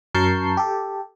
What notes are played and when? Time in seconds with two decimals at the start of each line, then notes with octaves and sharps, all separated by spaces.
0.15 F#2 A#4 A5 C#6 G6 C7
0.57 G4 A4